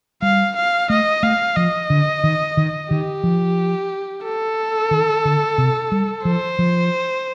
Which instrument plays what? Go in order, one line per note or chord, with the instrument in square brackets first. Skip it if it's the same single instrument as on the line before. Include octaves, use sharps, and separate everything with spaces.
[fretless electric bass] G3 [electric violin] F5
[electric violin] F5
[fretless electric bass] A3 [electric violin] D#5
[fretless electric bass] A3 [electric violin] F5
[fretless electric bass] F3 [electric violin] D#5
[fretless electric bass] D3
D#3
D#3
[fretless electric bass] D#3 [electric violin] G4
[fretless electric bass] F3
[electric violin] A4
[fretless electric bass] D#3
D3
C3
G3
[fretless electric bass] F3 [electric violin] C5
[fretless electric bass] F3